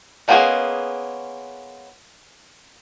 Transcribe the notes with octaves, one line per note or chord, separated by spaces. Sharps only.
G#3 A#3 B3 C#4 G#4